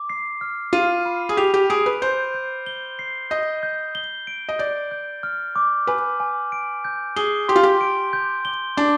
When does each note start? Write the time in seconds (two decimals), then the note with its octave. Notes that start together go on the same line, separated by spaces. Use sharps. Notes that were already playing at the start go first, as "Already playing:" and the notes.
Already playing: D6
0.09 C7
0.41 F6
0.73 F4 D#7
1.06 B5
1.29 G#4
1.37 G4 F7
1.54 G4
1.70 G#4 D7
1.86 B4
2.02 C5 G6
2.34 G6
2.66 G7
2.99 C7
3.30 D#5 G6
3.63 G6
3.95 G7
4.27 D7
4.49 D#5
4.59 D5 G6
4.91 G6
5.23 F6
5.56 D6
5.87 B4 G#5
6.20 G#5
6.52 D7
6.85 G6
7.16 G#4 G7
7.48 G4 C6
7.56 F4
7.63 G4
7.81 D7
8.13 G6
8.45 G7
8.77 D4 D6